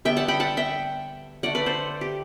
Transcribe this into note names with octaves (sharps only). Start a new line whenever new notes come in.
D3 G3 B3 E5 G5
F#5 A5
G5 B5
F#5 A5
E5 G5
D3 A3 D5 F#5
B4 D5
A4 C5
G4